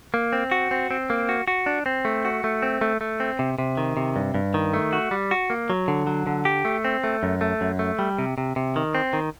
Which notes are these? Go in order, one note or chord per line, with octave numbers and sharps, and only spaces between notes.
A#3
C4
F#4
C4
C4
A#3
F#4
F#4
D4
C4
A3
F#4
A3
C4
A3
A3
C4
C3
C3
D#3
C3
G2
G2
D#3
A3
F#4
G3
F#4
A#3
F#3
D3
F#3
D3
G4
A3
C4
A3
F#2
A3
F#2
A3
G3
C3
C3
C3
D#3
C4
D#3